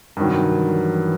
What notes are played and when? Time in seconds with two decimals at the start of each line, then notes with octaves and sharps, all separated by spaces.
0.17 G2 C3 D#3 F#3
0.62 E3